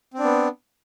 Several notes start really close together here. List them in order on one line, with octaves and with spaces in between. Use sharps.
C4 D4 B3